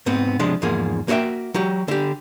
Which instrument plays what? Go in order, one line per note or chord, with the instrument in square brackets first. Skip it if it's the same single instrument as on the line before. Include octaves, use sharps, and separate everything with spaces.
[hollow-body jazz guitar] G#2 B3 C4
C3 F3 G#3 D4
E2 G#2 F3 A#3 G#4
A#3 F#4 C#5 E5 G5
F#3 F#4 G4
D3 G4